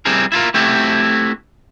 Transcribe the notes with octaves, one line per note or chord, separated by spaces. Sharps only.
G3 C4 E4 G#4 A#4
E4 F4 A4 A#4
A3 C4 E4 F#4 G4 A4